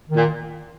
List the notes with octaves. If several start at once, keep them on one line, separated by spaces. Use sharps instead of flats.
D#3
A#2